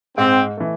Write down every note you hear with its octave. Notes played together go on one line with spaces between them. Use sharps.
G#2 C4
E3 A3